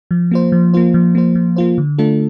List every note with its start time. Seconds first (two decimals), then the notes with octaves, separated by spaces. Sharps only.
0.11 F3
0.31 A#3 F4 C5
0.52 F3
0.74 A#3 F4 C5
0.94 F3
1.15 A#3 F4 C5
1.35 F3
1.56 A#3 F4 C5
1.78 D3
1.98 A3 D4 F4 A4